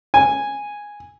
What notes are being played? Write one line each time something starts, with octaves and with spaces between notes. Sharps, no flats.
G#5